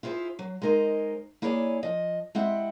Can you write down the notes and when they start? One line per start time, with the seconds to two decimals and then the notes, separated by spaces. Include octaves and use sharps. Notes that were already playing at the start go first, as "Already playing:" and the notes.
0.03 E4 F4 G#4 A#4 C5
0.39 F#3
0.62 G#3 D#4 A#4 C5 D#5
1.42 A#3 E4 G#4 C#5 D5 G#5
1.83 F3 D#5
2.35 G#3 C4 E4 G4 E5 F#5